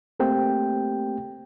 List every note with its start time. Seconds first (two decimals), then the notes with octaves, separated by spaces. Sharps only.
0.20 A3 A#3 C4 G4 G5